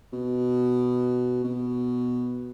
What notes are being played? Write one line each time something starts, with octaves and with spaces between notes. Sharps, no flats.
B2
B2